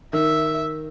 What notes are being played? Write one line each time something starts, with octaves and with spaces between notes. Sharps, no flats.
D#3 E5